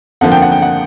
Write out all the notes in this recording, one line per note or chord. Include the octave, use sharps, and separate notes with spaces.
F2 D3 F3 A#3 F#5
G5
F#5
G5
F#5